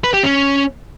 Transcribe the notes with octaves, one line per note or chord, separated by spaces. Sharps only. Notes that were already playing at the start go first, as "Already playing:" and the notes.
B4
G4
C#4